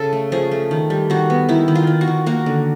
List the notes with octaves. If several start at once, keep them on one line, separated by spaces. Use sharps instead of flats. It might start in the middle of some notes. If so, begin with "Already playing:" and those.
Already playing: C#3 A4
A3
F3 G#4
A3
D#3
G3
D#3 F#4
B3
D#3 E4
D#3
F4
D#3
F#4
D#3
A#3 F#4
D3